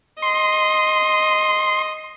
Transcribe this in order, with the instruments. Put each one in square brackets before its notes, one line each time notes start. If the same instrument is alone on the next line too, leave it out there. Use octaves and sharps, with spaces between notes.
[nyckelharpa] D#5 [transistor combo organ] C6